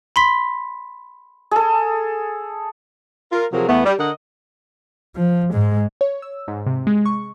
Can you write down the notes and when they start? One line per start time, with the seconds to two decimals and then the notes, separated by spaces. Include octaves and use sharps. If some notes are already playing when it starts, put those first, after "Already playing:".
0.16 B5 C6 B6
1.51 G#4 A4
3.32 F4 A#4
3.53 C3 F3 F#3 G#4 A#4
3.69 E2 A3 B3
3.85 G3
3.99 D3 A#4 D#5 F#5
5.16 F3
5.53 G#2 G#3
6.01 C#5
6.22 E6
6.48 G#2
6.66 C3
6.87 G#3
7.06 C#6